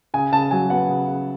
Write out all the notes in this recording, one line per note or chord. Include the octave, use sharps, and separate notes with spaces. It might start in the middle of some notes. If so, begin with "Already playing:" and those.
C#3 G#5
C#3 A5
F#3 G#5
B3 F#5
C#3
C#3